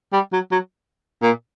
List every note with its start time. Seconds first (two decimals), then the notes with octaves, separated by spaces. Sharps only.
0.13 G3
0.33 F#3
0.52 F#3
1.22 A#2